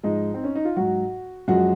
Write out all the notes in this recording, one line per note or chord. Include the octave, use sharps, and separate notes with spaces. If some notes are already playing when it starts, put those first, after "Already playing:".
G#2 F3 G#3 D#4
C4
C#4
D#4
F4
G#2 F#3 F#4
F#2 F3 G#3 F#4